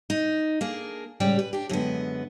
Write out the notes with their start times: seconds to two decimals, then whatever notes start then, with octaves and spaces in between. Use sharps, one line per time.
0.10 D#4
0.61 A#3 D4 G#4
1.20 A2 C#3 G3 G#3 G4
1.39 B4
1.53 D4 G4
1.69 F#2 D3 G#3 B3